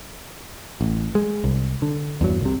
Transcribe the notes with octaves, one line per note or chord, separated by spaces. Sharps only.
A1
G#3
C2
D3
E2 G2 F#3
C2 C3